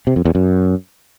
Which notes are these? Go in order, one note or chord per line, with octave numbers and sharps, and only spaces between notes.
C3
F2
E2
F#2